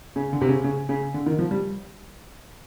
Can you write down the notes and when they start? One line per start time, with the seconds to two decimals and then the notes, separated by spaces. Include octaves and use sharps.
0.16 C#3
0.33 D3
0.41 C3
0.48 C#3
0.64 C#3
0.89 C#3
1.14 D3
1.26 D#3
1.39 F3
1.51 G3